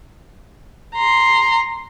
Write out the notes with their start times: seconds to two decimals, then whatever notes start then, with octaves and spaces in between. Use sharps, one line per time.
0.95 A#5 C6